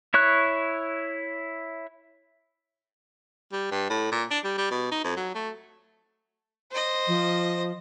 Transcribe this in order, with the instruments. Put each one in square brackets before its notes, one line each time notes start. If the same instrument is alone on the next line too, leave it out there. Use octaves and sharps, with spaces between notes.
[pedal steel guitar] E4 C#5 C#6 F#6
[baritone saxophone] G3
G2
A2
A#2
D4
G3
G3
B2
D#4
F2
F#3
A3
[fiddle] C5 D#5
[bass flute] F3